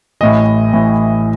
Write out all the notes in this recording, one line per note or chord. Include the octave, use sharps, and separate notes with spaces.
A1 A2 E3 D#5
A1 A2 E3